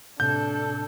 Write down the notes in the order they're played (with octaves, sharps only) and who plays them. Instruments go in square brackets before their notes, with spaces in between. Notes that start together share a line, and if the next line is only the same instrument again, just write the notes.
[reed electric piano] A2 C3 [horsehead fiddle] D4 A4 [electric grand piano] G6